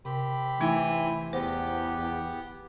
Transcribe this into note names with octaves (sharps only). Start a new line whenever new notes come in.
C3 C4 G4 B5
E3 A3 D#4 B4
E2 B3 G4 C5